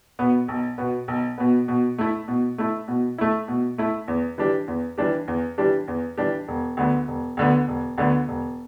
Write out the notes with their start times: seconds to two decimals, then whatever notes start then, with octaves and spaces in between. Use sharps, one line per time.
0.19 B2 B3
0.48 B1
0.78 B2 B3
1.08 B1
1.38 B2 B3
1.68 B2
1.98 A3 E4
2.28 B2
2.58 A3 E4
2.88 B2
3.18 A3 E4
3.48 B2
3.78 A3 E4
4.08 E2
4.38 E3 G3 D4 G4
4.68 E2
4.98 E3 G3 D4 G4
5.28 E2
5.58 E3 G3 D4 G4
5.88 E2
6.18 E3 G3 D4 G4
6.48 E1
6.77 D2 D3 B3
7.08 E1
7.37 D2 D3 B3
7.68 E1
7.98 D2 D3 B3
8.28 E1